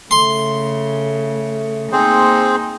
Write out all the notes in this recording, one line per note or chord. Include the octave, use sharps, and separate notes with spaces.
C#3 A3 C6
A#3 C4 D#4 G#4 C5